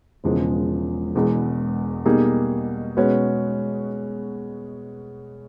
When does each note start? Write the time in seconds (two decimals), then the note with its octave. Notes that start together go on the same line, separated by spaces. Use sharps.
0.24 E1 E2 C#3 F3 G#3
1.15 E1 E2 B2 G#3 B3
2.05 B2 G3 A#3 D#4 G#4
2.97 B2 G#3 C#4 F#4 B4